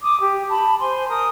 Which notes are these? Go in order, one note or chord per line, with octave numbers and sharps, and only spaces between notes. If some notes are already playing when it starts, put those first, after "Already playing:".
D6 D#6
G4
A5 B5
C5 G#5 C6
A#4 D#6